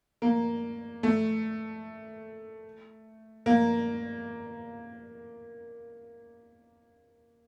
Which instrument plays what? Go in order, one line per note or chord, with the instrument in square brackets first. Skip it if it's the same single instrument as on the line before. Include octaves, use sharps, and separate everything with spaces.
[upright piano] A#3
A3
A#3